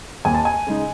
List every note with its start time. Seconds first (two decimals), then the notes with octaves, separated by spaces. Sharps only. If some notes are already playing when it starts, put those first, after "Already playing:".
0.25 D#2 G#5
0.35 A5
0.45 G#5
0.67 C#3 G#3 D#4